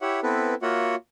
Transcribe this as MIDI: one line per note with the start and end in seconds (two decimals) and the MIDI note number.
0.01 0.20 64
0.01 0.20 67
0.01 0.20 73
0.01 0.20 76
0.01 0.20 78
0.23 0.55 59
0.23 0.55 60
0.23 0.55 64
0.23 0.55 69
0.23 0.55 71
0.62 0.95 58
0.62 0.95 65
0.62 0.95 66
0.62 0.95 73
0.62 0.95 76
0.62 0.95 78